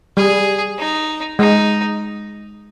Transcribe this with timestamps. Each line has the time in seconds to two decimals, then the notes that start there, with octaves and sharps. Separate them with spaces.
0.17 G3 G#4
0.79 D#4
1.39 G#3 D#4